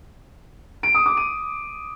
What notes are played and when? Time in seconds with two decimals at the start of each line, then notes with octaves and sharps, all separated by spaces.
0.83 D7
0.95 D#6
1.06 D6
1.17 D#7